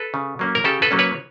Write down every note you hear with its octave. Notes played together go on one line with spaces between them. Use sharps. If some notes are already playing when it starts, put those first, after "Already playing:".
Already playing: A4 B4
C#3
F#3 A#3 C#4
A#4
C#3 G4 A4
A4 B4
F#3 A#3 C#4
B4 C#5